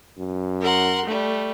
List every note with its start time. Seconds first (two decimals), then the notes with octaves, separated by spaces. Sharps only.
0.18 F#2
0.62 A#4 F#5 C6
1.05 G3 A3